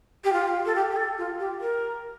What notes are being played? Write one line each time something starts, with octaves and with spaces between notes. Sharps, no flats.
G4
F4
A4
G4
G4
A4
F4
G4
A#4